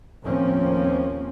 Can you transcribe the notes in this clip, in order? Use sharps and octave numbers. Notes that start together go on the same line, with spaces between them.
D#2 A2 F3 A#3 C4 C#4